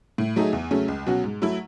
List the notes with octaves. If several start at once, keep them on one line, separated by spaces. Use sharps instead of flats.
A2
F#3 A3 D#4 G#4
E2
C#3 F#3 A3 C#4
C#2
B2 F#3 C#4 F#4
G#2
F#3 A3 E4